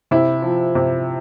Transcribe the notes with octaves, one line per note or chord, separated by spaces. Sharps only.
C3 E4
F3
C3